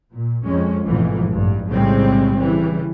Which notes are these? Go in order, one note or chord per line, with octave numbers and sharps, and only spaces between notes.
A#2
F2 G#3 C#4
A1 F2 G#2 B2 E3 F3
A1 G2
B1 A2 C#3 G3 G#3 C4
C#3 E3 G3